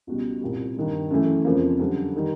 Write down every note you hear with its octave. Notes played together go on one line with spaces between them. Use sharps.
C#2 B2 G3
C2 A#2 G3
G2 D#3 G3
F#2 C#3 E3 A3
F2 C#3 F3 A#3
F#2 D3 G3
D#3 G3